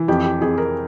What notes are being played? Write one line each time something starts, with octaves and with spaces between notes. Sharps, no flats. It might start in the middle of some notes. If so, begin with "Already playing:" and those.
Already playing: E3
F2 G4
G4
F2 G#4
A#4